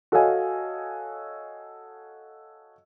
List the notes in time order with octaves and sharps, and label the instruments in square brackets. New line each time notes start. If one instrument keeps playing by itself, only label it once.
[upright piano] F#4 A4 C#5 D#5 F5 G#5